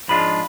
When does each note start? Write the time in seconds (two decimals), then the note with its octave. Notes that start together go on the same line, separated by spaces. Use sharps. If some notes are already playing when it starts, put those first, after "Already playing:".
0.08 G#2 F3 G#3 D4 F4 B5